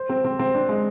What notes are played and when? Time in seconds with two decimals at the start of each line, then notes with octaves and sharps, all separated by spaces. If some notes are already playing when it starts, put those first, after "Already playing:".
Already playing: C5
0.09 C4
0.24 C4
0.39 C4
0.54 D4
0.69 G#3